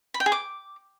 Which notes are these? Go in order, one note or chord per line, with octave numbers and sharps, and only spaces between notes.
B5
G5
G#4
D6